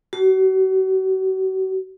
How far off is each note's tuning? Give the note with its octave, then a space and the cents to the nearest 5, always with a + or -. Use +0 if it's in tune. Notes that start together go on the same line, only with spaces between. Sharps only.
F#4 +40